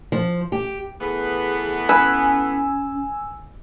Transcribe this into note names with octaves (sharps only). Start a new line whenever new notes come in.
F3
G4
E3 A3 B3 G#4
C#4 B4 G#5 E6